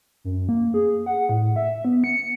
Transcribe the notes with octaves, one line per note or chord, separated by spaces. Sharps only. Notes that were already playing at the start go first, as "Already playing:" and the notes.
F#2
A#3
G#4
F#5
A2
E5
B3
C#7